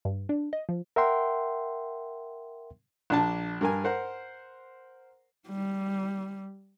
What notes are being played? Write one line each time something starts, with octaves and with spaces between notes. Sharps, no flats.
G2
D4
D#5
F3
A#4 E5 F#5 G5 C6
A#1 D4 A5
G2 A#4 G#5
A#4 C5 F#5
G3